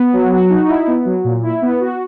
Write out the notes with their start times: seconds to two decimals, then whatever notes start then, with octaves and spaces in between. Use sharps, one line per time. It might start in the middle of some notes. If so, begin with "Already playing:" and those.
Already playing: B3
0.13 F#3
0.31 F#4
0.50 D#4
0.68 E4
0.87 B3
1.05 F#3
1.24 A#2
1.43 E4
1.62 B3
1.80 F#4